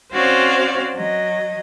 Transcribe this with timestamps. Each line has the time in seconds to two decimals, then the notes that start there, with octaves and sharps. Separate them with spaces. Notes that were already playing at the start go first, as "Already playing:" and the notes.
0.14 C4 C#4 F#4 C5 D5 F5
0.94 F#3 D#5